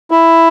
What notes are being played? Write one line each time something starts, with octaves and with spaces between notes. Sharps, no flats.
E4